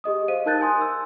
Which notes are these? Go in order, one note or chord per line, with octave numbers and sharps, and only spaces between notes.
G4 G#4 D#5 D#6
C5 D#5 F5 D#7
D#4 A#4 A5 F#6 G6 A6
G#5 C6 D#6
E6